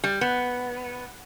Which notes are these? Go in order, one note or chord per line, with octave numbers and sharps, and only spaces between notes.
G3
B3